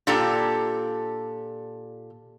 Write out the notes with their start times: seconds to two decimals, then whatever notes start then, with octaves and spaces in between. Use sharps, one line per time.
0.07 A#2 D4 G4 A4 A#5